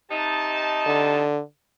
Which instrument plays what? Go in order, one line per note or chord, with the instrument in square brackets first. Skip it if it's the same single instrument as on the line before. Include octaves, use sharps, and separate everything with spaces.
[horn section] C3 D#4 A5
[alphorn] D3